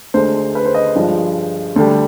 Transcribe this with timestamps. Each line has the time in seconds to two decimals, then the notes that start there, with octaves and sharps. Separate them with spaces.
0.14 D2 D3 G#3 C5
0.55 B4
0.65 C5
0.74 D#5
0.95 G2 F3 G#3
1.76 D2 D3 G3